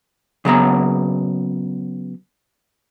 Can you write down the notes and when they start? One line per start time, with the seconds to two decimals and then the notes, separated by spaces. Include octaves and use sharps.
0.45 C#3 F#3 B3 A#5